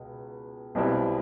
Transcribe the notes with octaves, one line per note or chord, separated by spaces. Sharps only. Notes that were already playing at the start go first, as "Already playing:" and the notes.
Already playing: C#2 B2
B1 B2 G3 C4 E4